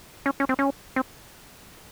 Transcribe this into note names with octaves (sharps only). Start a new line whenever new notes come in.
C#4
C#4
C4
C#4
C4